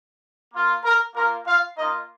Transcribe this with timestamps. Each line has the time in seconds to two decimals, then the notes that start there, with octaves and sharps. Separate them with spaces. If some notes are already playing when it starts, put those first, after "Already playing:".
0.52 A#3 F4
0.84 A#4
1.14 A#3 F4 A#4
1.45 F4 F5
1.77 A#3 D#4 F4 D#5